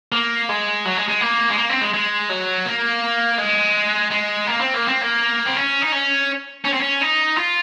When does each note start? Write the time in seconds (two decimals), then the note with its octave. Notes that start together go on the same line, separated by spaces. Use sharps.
0.12 A#3
0.49 G#3
0.85 F#3
0.97 G#3
1.08 G#3
1.21 A#3
1.50 G#3
1.58 A#3
1.69 C4
1.81 G#3
1.94 G#3
2.30 F#3
2.65 A#3
3.38 G#3
4.11 G#3
4.47 A#3
4.61 C4
4.74 A#3
4.88 C4
5.01 A#3
5.45 C4
5.56 C#4
5.82 D#4
5.92 C#4
6.65 C#4
6.73 C4
6.80 C#4
7.01 D#4
7.37 F4